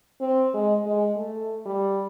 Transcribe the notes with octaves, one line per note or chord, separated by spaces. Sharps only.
C4
G#3
G#3
A3
G3